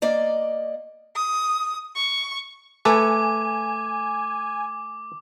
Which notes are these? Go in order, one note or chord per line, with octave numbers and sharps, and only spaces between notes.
A#3 D5 D#5
D#6
C#6
A3 A4 B4 G#5 D6